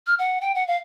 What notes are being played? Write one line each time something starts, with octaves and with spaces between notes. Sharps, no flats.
F6
F#5
G5
F#5
F5